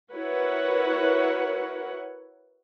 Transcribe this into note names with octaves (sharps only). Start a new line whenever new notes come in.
E4 F#4 A#4 B4 C#5 F#5